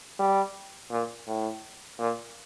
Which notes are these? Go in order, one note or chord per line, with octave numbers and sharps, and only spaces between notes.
G3
A#2
A2
A#2